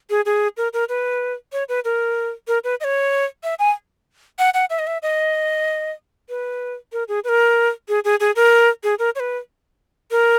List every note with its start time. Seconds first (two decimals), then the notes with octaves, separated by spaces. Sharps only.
0.10 G#4
0.26 G#4
0.57 A#4
0.73 A#4
0.89 B4
1.53 C#5
1.69 B4
1.85 A#4
2.48 A#4
2.64 B4
2.80 D#5
2.84 C#5
3.44 E5
3.59 G#5
4.39 F#5
4.54 F#5
4.70 E5
4.79 D#5
4.87 E5
5.03 D#5
6.29 B4
6.93 A#4
7.08 G#4
7.24 B4
7.29 A#4
7.88 G#4
8.04 G#4
8.20 G#4
8.36 A#4
8.83 G#4
8.99 A#4
9.15 C#5
9.20 B4
10.11 A#4